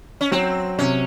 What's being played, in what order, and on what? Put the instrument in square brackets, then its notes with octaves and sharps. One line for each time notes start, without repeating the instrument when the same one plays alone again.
[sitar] C#4
[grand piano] F#3 [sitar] C4
[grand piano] C3 [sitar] C#4